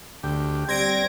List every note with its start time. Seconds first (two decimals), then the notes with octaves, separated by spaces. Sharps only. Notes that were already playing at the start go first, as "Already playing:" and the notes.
0.24 D2 G4
0.68 G3 C4 G#6 A#6 D7